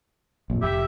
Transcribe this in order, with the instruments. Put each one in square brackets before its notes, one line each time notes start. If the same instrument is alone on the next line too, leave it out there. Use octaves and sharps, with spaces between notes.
[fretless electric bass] A#1 F2
[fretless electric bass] F1 [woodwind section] G4 E5